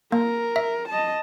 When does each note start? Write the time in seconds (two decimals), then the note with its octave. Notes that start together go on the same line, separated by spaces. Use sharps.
0.12 A#3 A#4
0.56 E5
0.89 D#5 A5